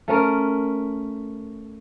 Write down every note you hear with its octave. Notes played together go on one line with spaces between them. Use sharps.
A3 C#4 A#4